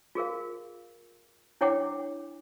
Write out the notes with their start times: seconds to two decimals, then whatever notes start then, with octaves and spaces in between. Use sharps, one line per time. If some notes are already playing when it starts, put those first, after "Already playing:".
0.15 F4 G#4 A#4 F5
1.61 D4 E4 C#5 F#5 G5 D6